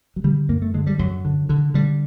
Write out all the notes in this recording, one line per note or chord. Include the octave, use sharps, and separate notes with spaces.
F#3
D3 G3
F#2 A#3
A3
D3 G#3
G3
F#2 F#3
D3
D3
D3 G3